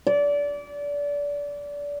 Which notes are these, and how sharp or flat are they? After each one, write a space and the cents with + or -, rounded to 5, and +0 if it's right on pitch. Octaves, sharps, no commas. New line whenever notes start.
D5 -25